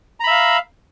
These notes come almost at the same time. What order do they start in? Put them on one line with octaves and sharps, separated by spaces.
A#5 B5 E5 F5